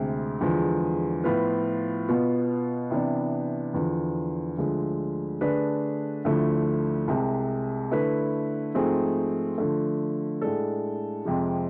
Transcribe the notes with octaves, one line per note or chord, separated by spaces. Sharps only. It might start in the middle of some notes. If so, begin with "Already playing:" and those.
Already playing: D2 C3 G#3 C4
E2 D3 F3 G#3
A2 F3 B3 F4 B4
B2 B3 F4
C3 E3 B3 D4
E2 D3 F3
D2 D3 F3 G#3
D3 A3 D4 G#4 B4
D2 D3 F3 A3 E4
C2 C3 G#3
D3 A3 E4 B4
G#2 F3 A3 C4 G#4
D3 F3 A3
A2 G#3 D4 A4
F2 C3 F3 G#3